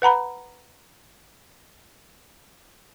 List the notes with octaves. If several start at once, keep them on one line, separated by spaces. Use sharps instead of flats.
B4 F#5 A#5 B5